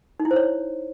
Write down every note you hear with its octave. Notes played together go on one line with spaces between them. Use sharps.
D#4
E4
C5
C#5